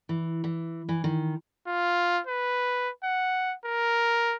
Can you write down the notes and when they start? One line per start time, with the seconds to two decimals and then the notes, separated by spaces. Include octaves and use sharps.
0.09 E3
0.44 E3
0.89 E3
1.04 D#3
1.67 F4
2.27 B4
3.04 F#5
3.65 A#4